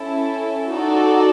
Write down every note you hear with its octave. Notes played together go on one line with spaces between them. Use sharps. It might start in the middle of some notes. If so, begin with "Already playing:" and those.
Already playing: C#4 E4 A4
D#4 F#4 A4 D5